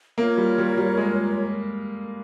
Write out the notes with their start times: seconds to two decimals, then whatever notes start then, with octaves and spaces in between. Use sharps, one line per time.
0.18 A#3 F4 A#4 C#5
0.38 G3
0.58 G3
0.78 G3
0.97 G#3